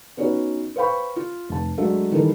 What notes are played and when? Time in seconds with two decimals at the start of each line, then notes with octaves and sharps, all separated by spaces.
0.17 B3 C#4 D#4 F#4 B4 C#5
0.76 B4 C5 F5 G5 B5 C#6
1.16 F4
1.49 F1 A5
1.78 F#3 G#3 A3 D4 A4 E5
2.12 D#3 E3 G3 A#3 E4 A4